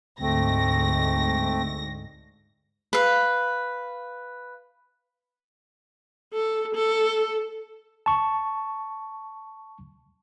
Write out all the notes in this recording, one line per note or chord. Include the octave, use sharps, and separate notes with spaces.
D2 G#2 A3 C4 A#6
B4 F5
A4
A4
A5 C#6